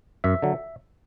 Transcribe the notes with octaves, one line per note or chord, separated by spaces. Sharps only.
F#2 E5
D3 F#3